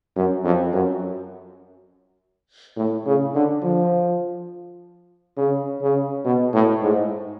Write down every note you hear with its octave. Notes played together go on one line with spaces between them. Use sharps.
F#2
F2
F#2
A2
C#3
D3
F3
C#3
C#3
B2
A2
G#2